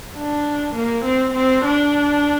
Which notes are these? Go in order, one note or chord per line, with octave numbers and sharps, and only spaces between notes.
D4
A#3
C4
C4
D4